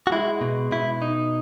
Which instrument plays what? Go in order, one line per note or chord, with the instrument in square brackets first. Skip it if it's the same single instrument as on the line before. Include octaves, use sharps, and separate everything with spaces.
[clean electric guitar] F#4
G#3 E4
B2
B2 E4
D#4